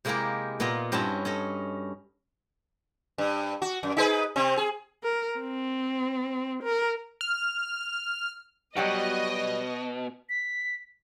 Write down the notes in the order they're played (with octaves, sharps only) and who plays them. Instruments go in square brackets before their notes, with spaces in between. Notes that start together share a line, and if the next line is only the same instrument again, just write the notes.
[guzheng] C3 G#3 A#3 E4 G4 A#4
A#2 B3 F4 D#5 A#5
G2 C4 C#4 E4 F#4 A5
C#4 A4 D#5
[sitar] G2
F#4
F#2
D#4 G#4 B4
C3 C4
G#4
[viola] A#4
C4
A#4
[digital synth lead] F6
[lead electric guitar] B2 [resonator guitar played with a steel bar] F#3 G3 F#4 [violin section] D#5
[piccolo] B6